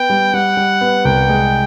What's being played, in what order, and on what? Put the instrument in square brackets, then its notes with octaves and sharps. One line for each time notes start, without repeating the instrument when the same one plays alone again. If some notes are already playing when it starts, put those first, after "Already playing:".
Already playing: [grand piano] B3 [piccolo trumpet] G5
[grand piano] G3
[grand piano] G3 [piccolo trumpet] F#5
[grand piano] G3
B3
[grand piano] C2 [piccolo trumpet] G5
[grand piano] G#3